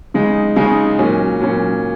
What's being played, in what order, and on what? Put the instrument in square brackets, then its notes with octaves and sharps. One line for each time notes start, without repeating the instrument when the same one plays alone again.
[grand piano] C#3 G#3 D#4
C#3 G#3 D#4
A#2 F#3 C#4
A#2 F#3 C#4